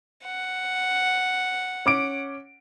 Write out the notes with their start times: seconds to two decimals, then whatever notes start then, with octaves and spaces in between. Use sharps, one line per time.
0.24 F#5
1.86 C#4 D6 D7